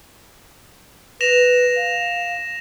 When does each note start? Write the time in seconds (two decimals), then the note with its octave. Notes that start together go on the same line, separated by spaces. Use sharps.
1.21 B4 A#6 E7 F7
1.77 F5